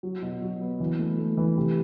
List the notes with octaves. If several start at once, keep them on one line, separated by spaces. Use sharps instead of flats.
F#3
B2
F#3
B3
E3
A3
A3
E3
C3